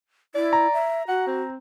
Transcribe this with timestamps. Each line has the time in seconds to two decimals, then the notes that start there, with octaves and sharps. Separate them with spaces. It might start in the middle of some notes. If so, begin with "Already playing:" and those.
0.35 E4 D5
0.53 A#5
0.73 E5
1.08 F#4 F#5
1.27 C4